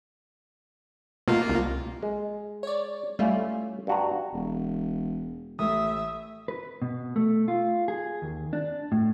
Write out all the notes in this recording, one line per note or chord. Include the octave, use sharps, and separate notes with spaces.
B2 A3 A#3 F4
C2
G#3
C#5 D5
G3 A3 C#4 E4 F4
G2 F#4 A#5
E1
A1 A3 E5 D#6
B4
B2
A3
F4
G#4
D#2
D4
A2